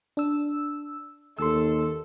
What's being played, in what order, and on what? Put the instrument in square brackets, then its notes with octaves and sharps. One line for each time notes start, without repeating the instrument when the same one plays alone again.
[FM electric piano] D4 E6
[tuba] D#2 [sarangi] A4 [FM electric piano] C6 E6